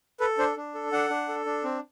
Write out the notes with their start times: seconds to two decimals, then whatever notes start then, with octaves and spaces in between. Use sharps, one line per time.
0.20 A4 B4
0.38 D4 C5
0.57 D4
0.75 A4
0.92 D4 F#5
1.10 D4
1.28 A4
1.46 D4
1.64 C4